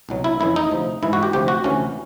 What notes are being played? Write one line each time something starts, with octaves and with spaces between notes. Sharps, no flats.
C2 B2 F#3
E4
F2 C#3 E3 E4
D#4
D2 C3 F3
G#2 E3 E4
F#4
G4
D2 C3 F3 G4
F#4
D2 C3 E3 C#4